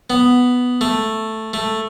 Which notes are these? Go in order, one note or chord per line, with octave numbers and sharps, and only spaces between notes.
B3
A3
A3